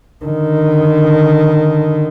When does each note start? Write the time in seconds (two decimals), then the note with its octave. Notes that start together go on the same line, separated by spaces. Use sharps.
0.25 D3 D#3